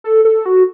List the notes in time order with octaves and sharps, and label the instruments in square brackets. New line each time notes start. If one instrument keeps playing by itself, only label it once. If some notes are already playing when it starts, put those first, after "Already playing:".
[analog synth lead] A4
A4
F#4